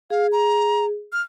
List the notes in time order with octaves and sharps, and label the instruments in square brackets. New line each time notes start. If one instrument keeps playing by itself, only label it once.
[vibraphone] G#4 [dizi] F5
[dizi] A#5
F6